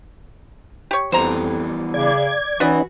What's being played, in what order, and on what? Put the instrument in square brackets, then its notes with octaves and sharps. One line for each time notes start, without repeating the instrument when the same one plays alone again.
[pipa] G4 C#5
[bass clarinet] F2 [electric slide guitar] E3 G3 B3 [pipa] C5 A#5
[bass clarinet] C#3 [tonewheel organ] D5 G#6
[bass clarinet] E3 [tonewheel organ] C#4 D#4 [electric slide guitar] F#4 [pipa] B4 D5 D#5